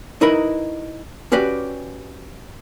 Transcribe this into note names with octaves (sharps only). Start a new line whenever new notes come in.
D#4 E4 A#4 B4 D#5 B5
C#4 F#4 G4 B4 D5